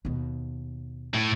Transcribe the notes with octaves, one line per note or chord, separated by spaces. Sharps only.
D#2 B2
A2